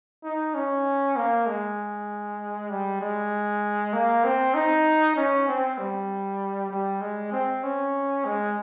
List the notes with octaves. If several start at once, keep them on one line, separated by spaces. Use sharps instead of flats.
D#4
C#4
A#3
G#3
G3
G#3
A#3
C4
D#4
C#4
C4
G3
G3
G#3
C4
C#4
G#3